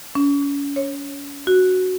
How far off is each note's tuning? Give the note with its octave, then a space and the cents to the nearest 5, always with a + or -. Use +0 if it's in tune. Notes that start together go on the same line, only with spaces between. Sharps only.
C#4 +35
C#5 -10
F#4 +0